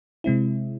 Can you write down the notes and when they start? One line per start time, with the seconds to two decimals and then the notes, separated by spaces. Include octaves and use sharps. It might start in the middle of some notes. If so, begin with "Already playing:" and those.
0.24 C3 G#3 C4 E4